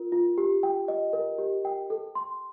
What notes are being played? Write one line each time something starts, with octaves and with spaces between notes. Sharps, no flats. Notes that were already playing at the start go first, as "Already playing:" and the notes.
Already playing: F4 A#4
F4
G4
G5
D#5
A#4
G4
G5
A4
C6